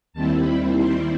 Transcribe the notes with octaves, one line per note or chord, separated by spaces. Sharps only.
D#2 D#3 G3 C4 E4 A5
B5
C6